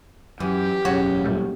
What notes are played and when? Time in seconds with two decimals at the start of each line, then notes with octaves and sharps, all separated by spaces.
0.40 F#2 E3 G4
0.85 E1 F#2 C#3 F#4 C#5
1.24 A#2 G3 A3